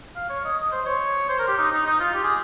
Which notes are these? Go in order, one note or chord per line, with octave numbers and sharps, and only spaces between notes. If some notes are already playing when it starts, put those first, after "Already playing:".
F5
C#5
D#5
D#5
C5
C#5
C5
A#4
G4
D#4
D#4
D#4
F4
G4
G#4